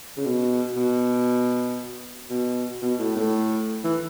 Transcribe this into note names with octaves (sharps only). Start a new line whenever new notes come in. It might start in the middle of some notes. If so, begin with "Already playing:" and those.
C#3
B2
B2
B2
B2
A2
A2
E3